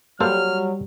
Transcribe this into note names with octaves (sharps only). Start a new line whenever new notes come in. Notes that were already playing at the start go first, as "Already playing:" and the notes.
F#3 G3 A#3 A4 C5 F6